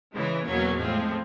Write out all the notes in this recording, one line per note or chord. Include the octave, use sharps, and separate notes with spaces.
C#3 E3 G#3
E2 B2 F#3 A#3 C#4
A2 F3 G#3 C4